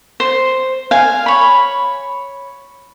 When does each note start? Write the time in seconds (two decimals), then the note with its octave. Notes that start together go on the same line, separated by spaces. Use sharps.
0.20 C5
0.91 F5 G#5
1.26 C#5 B5